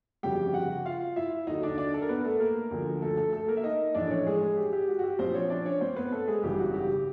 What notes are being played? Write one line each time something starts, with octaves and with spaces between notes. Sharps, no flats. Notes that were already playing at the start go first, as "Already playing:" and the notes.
G1 F2 C#3 F#3 G4 G5
F#4 F#5
F4 F5
E4 E5
D#2 D3 F#3 D#4 D#5
D4 D5
D4 D5
A4
A#4
B3 B4
A3 A4
A#3 A#4
D2 D3 F3
A3 A4
A3 A4
A3 A4
A#3 A#4
E5
D#4 D#5
A#1 A2 E3 D4 D5
C#4 C#5
G#3 G#4
G4
G4
F#4
F#4
G4
A#1 A#2 F3 C4 C5
C#4 C#5
D4 D5
C#4 C#5
C4 C5
B3 B4
A3 A4
G#3 G#4
G#1 F#2 C#3 E3 G3 G4
F#4
G4